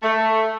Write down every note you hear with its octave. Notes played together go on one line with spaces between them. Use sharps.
A3